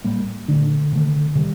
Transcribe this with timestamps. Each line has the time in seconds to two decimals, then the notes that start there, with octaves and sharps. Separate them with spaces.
0.04 A2 G3 A#3
0.48 A#2 D3 A3 D4
0.92 C3 D#3 A3
1.35 C3 D#3 G3